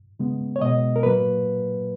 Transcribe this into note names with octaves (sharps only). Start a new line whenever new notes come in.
C#3 G#3 B3
C#5
B2 G#3 B3 D#5
A#4
A#2 F#3 A#3 B4